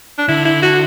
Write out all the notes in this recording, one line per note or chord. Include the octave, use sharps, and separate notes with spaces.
D4
D3 E4
E4
F#4